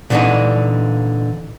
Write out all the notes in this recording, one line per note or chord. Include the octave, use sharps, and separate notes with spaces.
A#2 D3 E3 G3 D4 D#4